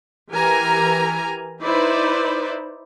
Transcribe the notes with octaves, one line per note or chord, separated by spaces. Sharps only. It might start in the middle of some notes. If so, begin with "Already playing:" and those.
E3 G4 A#4 G#5 A#5
D#4 E4 B4 C5 D5